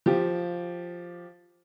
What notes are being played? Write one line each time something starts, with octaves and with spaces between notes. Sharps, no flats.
F3 G4